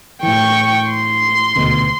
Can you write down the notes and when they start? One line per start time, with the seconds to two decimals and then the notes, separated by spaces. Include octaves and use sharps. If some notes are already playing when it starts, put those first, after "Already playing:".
0.23 A2 E3 G5 C#6
0.91 C6
1.56 D#1 D2 B2